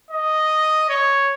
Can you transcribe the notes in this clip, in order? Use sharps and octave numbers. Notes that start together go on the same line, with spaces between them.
D#5
C#5